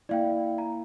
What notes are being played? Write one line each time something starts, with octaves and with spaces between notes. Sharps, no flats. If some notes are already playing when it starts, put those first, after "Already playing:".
A#3 E4 D5 F5 G5
A#5